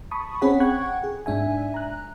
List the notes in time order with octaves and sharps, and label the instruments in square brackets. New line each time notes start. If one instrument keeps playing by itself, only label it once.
[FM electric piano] A5 B5 C#6 D#6
C4 C#4 G#4 C#5 F#5 B5
F#5 G5 C#6 F#6 G#6
G#4
G#2 D4 E5 G#5
A#5 F#6